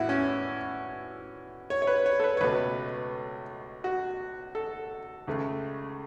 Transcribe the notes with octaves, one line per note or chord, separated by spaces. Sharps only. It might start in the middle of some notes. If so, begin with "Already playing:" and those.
Already playing: A2 E3 B3 E4 F#4
C#4
C#5
C#5
B4
C#5
A4
B4
C#5
C#2 B2 A3 B4
F#4
A4
C#2 C#3 A3